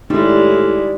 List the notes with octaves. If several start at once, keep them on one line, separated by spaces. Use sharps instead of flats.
A2 G3 G#3 D#4 E4